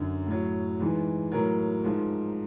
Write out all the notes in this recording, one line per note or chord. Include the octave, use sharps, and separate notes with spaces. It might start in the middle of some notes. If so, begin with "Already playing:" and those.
Already playing: F#2 D3 F#3
A2 F#3
G#2 E3
A2 F#3 A#4
G#2 F3